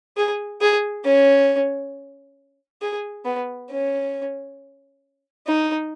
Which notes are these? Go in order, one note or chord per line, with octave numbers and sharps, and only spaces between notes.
G#4
G#4
C#4
G#4
B3
C#4
D#4